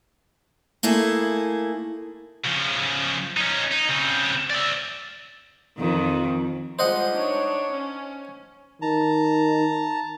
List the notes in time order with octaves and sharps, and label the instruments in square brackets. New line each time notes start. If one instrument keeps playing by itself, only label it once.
[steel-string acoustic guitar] A3 A#3 E4 G#4
[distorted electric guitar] C#3 F3
C#4 D#4
D#4
C#3 C4
D5 E5
[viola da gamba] F2 D#3
[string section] F3 G3 G#3 [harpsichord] C5 D#5 F#5
[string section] D4 D#4 C#5
C#4
[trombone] D#3 [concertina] A5 A#5